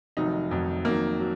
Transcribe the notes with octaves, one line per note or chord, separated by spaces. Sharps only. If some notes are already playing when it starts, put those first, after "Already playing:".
F1 F2 D#3 F#3 D#4
F1 F2 D#3 F#3
F2 D#3 F#3 A#3
F#3